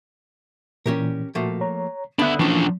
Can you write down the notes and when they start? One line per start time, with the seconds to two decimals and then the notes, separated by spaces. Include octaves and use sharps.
0.86 A#2 E3 C#4 G4 A#4
1.35 A#2 F3 A3 A#3 F#4
1.61 C#5 A#5
2.19 D3 B3 D4 E5 B5 D#6 F#6
2.40 E3 F3 A3 C#4 D4